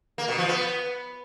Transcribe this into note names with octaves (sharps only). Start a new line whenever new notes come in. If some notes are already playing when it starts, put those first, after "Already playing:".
A#3
B2
F3
B3